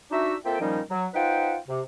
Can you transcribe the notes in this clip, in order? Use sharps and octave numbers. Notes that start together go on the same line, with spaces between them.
D4 D#4 F#4 E5
A#3 C4 F4 A4 E5 G5
A#2 D#3 F3 G3 C#4 D#4
F#3
D#4 F4 B4 C5 F#5 G5
C3